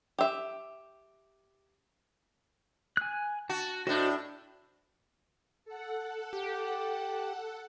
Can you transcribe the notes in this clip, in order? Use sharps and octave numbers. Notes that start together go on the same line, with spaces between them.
G4 E5
G#5 F#6
F#4 A5
A2 D4 F#4 C5 D#5
A4 F#5
G4